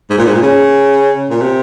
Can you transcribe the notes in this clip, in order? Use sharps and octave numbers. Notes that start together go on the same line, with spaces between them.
G#2
A#2
G#2
A#2
C#3
A#2
C3